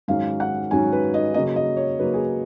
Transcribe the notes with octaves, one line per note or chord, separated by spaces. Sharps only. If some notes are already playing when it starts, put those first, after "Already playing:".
G#2 D#3 F#3 C#4 F5
F#5
G#2 D#3 F#3 C#4 G#5
B4
D#5
C#3 F#3 A#3 D#5
D#5
C#5
C#3 F#3 A#3 B4
G#4